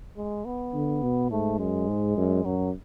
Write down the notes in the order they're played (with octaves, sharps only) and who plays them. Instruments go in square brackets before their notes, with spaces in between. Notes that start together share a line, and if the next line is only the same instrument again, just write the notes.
[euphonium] G#3
B3
[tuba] D3
B2
[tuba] G#2 [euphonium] A3
[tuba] F#2 [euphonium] G#3
[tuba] G#2
F#2
[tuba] F#2 [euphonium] F#3